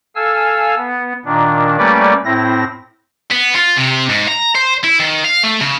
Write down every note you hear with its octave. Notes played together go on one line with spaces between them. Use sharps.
A4 F5 G#5 E6 F6
B3
A#2 D#3 D4
G3 A3 A#3 C#4 B4 D5
A2 C4 E4 A#6
B3
F4
C3
G#2
A#5
C5
E4
D#3
F5
A3
C#3